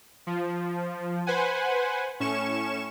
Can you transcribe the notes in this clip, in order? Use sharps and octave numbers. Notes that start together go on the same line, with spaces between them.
F3
B4 C5 F#5 G#5
A2 C#4 C#6 E7